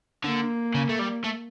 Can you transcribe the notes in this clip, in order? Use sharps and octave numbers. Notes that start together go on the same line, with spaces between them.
D3 A#3
C#3
A3
G3
A3